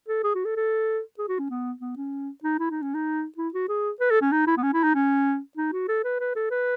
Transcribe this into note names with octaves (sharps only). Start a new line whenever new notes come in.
A4
G#4
F#4
A4
A4
G#4
F#4
C#4
B3
B3
C#4
D#4
E4
D#4
C#4
D#4
E4
F#4
G#4
B4
A4
C#4
D#4
E4
B3
C#4
E4
D#4
C#4
D#4
F#4
A4
B4
B4
A4
B4